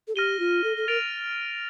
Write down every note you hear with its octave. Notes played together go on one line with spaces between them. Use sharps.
A4
G4 F6 A#6 D#7 G7
F4
A4
A4
A#4 A6 D7 F7